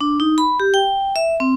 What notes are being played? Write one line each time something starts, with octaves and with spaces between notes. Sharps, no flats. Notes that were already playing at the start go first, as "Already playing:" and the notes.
D4
D#4
B5
G4
G5
E5
C4